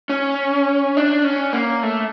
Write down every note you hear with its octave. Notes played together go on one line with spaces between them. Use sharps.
C#4
D4
C#4
A#3
A3